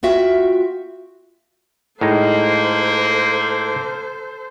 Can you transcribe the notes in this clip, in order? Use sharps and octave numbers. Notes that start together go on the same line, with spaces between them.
B3 F4 F#4 E5 G5
A2 G#3 A#3 D#4 A4 C5